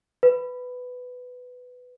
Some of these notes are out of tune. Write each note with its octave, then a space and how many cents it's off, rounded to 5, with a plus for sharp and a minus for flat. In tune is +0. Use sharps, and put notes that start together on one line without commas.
B4 +10